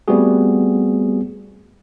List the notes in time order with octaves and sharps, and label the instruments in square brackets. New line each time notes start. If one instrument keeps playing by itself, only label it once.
[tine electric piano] G3 A3 B3 C4 F#4 G#4